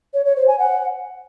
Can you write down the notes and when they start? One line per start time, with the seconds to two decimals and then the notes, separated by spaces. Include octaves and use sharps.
0.14 C#5
0.25 C#5
0.36 C5
0.48 G#5
0.59 F#5